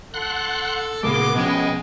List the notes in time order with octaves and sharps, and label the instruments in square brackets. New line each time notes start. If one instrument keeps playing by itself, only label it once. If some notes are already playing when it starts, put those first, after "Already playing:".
[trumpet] A4 [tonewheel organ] F#5 C6 F#6
[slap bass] A#2 C#3 A3 [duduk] B3 [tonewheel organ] G#4 A#4 C6 [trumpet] D6
[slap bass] B2 F3 C#4 [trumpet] G#3 [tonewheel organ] G5 G#5